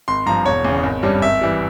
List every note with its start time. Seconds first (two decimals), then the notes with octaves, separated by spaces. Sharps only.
0.08 G#1 C6
0.26 G2 F3 A#5
0.45 E1 C#5
0.65 E2 C#3
0.83 G#1
1.03 G2 G3 C#4
1.21 G#1 E5
1.41 E3 G3